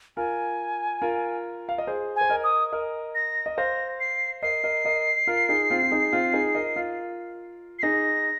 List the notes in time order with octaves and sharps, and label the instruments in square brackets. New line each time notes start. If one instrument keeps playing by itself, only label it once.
[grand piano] F4 A#4 [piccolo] G#5
[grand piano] F4 A#4
F5
D#5
G#4 C5
[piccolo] G#5
[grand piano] C5
A#4 D#5
[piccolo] D#6
[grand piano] A#4 D#5
[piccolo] A#6
[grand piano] D#5
[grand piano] C5 F5 [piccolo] A#6
[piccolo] C7
[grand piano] A#4 D#5 [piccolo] C7
[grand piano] A#4 D#5
A#4 D#5
F4 A#4
D#4 G#4
C4 F4
F4
D#4 G#4
C4 F4
D#4 G#4
A#4 D#5
F4 A#4
[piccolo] C7
[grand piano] D#4 G#4 [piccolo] A#6